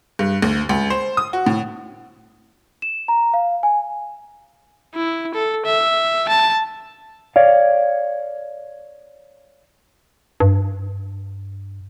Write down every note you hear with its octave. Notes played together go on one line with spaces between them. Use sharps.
G2
D2
C#2
C5
D#6
F#4
A2
E7
A#5
F5
G#5
E4
A4
E5
A5
C#5 D5 F5
G2